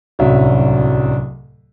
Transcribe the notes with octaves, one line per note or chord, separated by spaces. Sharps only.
D1 C2 F#3 C#4 E5